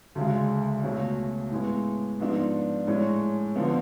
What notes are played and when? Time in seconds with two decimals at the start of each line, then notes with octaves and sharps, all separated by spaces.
0.15 D2 C#3 G#3
0.84 C#2 B2 A3 C#4
1.52 A2 G#3 B3
2.20 G#2 F3 B3 D4
2.87 A2 G#3 C#4
3.56 D3 F3 B3